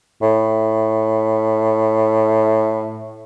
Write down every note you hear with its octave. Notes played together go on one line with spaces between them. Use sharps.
A2